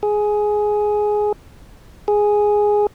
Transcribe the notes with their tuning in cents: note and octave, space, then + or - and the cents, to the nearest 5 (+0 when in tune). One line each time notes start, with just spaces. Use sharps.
G#4 +10
G#4 +0